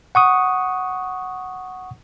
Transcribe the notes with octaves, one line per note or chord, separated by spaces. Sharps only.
F#5 C#6 D#6